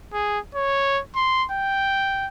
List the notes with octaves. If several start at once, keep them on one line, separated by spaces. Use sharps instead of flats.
G#4
C#5
C6
G5